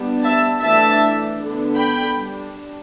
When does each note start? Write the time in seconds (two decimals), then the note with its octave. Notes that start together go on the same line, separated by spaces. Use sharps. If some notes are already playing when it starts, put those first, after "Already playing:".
Already playing: G3 B3 D4
0.23 E5 A5
0.62 E3 A3 D4 E5 A5
1.39 D3 B3 D4
1.77 G5 B5
2.15 G3 D4